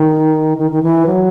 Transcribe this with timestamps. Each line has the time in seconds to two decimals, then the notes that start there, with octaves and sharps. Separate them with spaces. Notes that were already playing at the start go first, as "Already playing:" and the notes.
Already playing: D#3
0.58 D#3
0.71 D#3
0.83 E3
1.06 F#3